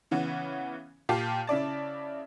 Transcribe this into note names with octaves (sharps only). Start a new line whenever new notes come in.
C#3 E3 B3 C#4
A#2 F4 G4 A5 C7
C#3 E4 D5 A5